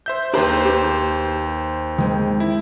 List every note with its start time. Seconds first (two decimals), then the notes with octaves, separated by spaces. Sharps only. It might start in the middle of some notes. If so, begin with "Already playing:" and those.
0.06 C5 E5 G6
0.34 D#2 G4 B4 C5 A5 A#5
0.66 G4 B4
1.98 D#3 G#3 C4
2.40 E4